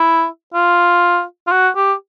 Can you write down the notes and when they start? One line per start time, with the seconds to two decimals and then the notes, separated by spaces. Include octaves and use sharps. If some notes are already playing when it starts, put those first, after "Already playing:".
Already playing: E4
0.54 F4
1.47 F4
1.52 F#4
1.76 G4